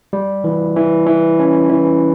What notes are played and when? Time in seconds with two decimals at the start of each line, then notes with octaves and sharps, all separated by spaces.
0.13 G3
0.44 E3
0.76 E3
1.07 E3
1.39 C#4
1.70 E3